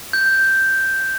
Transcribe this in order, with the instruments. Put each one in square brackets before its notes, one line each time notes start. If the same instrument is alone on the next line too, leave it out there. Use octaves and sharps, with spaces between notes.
[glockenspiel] G6